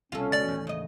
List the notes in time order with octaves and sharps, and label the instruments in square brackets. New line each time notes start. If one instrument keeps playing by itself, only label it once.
[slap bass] C2 B2 [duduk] C#4 [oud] F4 A4
[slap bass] C#2 [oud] B2 [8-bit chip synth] D5 A6
[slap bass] A1 D#2
[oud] C#3 D#5